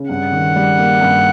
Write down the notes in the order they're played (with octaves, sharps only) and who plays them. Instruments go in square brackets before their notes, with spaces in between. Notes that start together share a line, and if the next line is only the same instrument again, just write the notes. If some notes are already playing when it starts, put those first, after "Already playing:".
Already playing: [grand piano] C#3
[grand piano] G2 [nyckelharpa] F#5
[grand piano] D#3
G3
A#3
G2